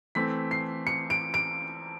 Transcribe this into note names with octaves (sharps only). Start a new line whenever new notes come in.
E3 A3 C4 B6
C7
C#7
D7
D7